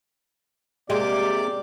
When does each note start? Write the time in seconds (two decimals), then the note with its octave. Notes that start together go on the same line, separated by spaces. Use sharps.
0.90 C3 G#3 A#3 G4 D5 D6